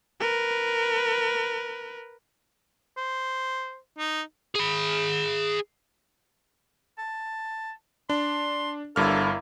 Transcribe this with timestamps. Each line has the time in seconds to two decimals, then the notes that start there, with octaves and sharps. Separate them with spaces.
0.20 A#4 B4
2.97 C5
3.99 D#4
4.55 G#4 B5
6.98 A5
8.10 D4 C6
8.96 G1 G2 A#3 E4 A4 F6